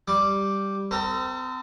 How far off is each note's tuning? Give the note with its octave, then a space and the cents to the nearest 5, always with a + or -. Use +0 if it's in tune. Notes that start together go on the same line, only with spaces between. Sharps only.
G3 +0 D6 +0
C4 -35 A4 +35 A#5 +0